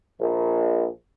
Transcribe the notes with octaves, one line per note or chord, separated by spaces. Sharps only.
A#1